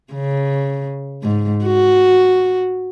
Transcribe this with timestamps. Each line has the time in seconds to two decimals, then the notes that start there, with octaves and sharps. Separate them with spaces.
0.13 C#3
1.23 G#2
1.65 F#4